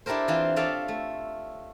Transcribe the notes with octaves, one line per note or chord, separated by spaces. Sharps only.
D4 E4 G4 A4 A#4 C5
E3 C4 F4
F4 A4 C#5 D5 E5 F5
A3